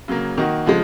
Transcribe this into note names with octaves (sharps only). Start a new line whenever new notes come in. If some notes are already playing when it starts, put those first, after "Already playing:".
C#3 F#3 A#3
D#3 A#3 D#4 F#4
C#3 F3 G#3